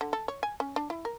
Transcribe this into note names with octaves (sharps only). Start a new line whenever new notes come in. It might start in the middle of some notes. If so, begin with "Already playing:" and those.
D3
A4
C#5
G#5
C#4
D4
E4
A#4